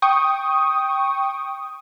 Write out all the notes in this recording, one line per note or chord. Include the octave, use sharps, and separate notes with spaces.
G5 C#6 D#6